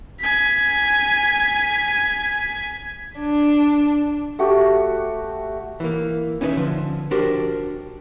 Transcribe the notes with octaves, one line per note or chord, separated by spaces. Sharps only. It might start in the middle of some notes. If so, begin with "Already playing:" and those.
G#5 B6
D4
A3 F#4 G4
E3 A#3
C#4 D#4 E4 A4 B4 E5
D3 F3
D4 F#4 G4 A#4 C5